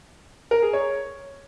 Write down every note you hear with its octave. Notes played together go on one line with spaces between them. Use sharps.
A#4
G#4
C#5